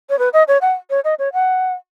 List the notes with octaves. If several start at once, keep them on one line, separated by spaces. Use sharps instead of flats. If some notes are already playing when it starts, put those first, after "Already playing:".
C#5
B4
D#5
C#5
F#5
C#5
D#5
C#5
F#5